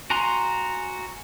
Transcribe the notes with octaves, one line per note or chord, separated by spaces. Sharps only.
F#4 G#5 A#5 C6 F#6